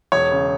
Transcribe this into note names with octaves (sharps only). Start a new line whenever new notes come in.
E1 C#5
C#3